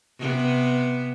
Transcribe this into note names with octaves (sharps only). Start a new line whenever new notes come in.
C3 B3